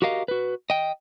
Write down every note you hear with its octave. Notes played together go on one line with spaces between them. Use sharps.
F#4 G4 A#4 D#5 F5
F#4 B4
D#5 G5